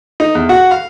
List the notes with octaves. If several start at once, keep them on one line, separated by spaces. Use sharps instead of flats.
D#4
E2
F#4
F5